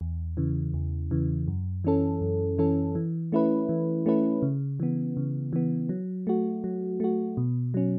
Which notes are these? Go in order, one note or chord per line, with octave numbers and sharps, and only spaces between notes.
E2
C#3 E3
E2
C#3 E3
F#2
E3 C#4 A4
F#2
E3 C#4 A4
E3
A3 C#4 E4 B4
E3
A3 C#4 E4 B4
C#3
E3 B3
C#3
E3 B3
F#3
A3 F#4
F#3
A3 F#4
B2
F#3 C#4